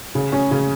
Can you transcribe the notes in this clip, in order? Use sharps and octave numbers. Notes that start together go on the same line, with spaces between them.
C#3
C#4
C#3